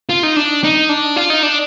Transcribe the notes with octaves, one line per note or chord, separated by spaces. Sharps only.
F4
D#4
D4
D#4
D4
F4
D#4
D4